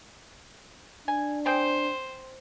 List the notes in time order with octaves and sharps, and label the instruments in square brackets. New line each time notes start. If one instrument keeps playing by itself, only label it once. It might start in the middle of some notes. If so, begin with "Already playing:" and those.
[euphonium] D4 [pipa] G#5
[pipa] C4 G#4 G5 [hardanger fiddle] C5